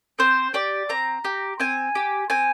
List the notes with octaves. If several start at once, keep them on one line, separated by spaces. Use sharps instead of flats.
C4 C5
G4 D5
C4 A#5
G4
C4 G#5
G4
C4 G#5